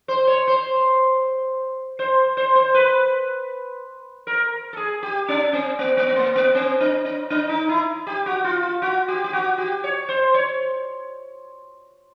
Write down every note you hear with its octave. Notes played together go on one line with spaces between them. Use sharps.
C5
C#5
C5
C5
C5
C5
B4
A#4
A4
G#4
G4
C#4
C4
B3
B3
B3
A#3
B3
C4
D4
D4
D4
D#4
E4
G4
F#4
F4
F4
F#4
G4
G4
F#4
G4
C#5
C5
C#5